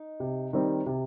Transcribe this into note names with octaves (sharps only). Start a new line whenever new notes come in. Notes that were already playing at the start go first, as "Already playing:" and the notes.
Already playing: D#4
C3
D#3 G3 C4
C3